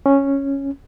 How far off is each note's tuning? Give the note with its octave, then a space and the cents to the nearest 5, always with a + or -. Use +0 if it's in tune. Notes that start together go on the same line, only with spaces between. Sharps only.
C#4 -5